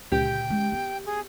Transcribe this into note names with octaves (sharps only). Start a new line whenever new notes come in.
C#2 A#2 D3 G4 G5
G#3 C#4
B3
G#4